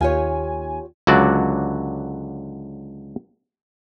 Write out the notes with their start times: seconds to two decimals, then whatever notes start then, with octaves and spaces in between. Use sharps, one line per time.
0.01 D#2 F4 G4 C#5 G#5
1.07 C#2 D3 F#3 F#4 D5